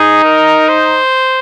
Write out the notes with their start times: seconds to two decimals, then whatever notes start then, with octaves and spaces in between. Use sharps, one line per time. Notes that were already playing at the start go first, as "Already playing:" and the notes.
Already playing: D#4 G#4
0.24 A#4
0.69 C5